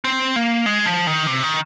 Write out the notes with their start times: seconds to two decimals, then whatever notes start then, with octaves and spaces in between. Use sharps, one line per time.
0.04 C4
0.36 A#3
0.66 G#3
0.86 F3
1.07 D#3
1.27 C3
1.43 D#3